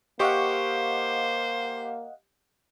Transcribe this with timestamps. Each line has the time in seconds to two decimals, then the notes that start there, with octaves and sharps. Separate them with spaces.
0.20 A#3 G4 C5 D#5 F5 F#5 C#6